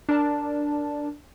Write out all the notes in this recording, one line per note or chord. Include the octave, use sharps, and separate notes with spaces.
D4 A#4 D5 A5